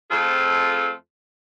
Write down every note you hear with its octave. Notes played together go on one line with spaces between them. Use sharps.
F2 A3 C4 F4 G#4 A4